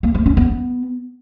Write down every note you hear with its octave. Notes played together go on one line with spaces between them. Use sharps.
A#3
A3
C#4
B3